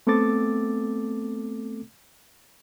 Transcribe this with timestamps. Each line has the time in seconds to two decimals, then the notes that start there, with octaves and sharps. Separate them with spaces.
0.07 A3 B3 C4 A4 D6 A6